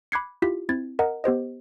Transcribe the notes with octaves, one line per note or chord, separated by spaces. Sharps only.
B5 D6 F#6 G#6 C7 C#7
E4 F4 G4 B6
C4 E4 G#6 A6
A#4 D#5 F#5 A#5
B3 G4 C5 D#5